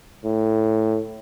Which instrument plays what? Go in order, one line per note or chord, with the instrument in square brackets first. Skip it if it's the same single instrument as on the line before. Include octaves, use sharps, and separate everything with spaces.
[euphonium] A2